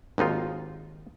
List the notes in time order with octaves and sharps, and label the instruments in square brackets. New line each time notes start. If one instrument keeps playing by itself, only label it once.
[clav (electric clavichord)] G#1 D#2 D#4 F4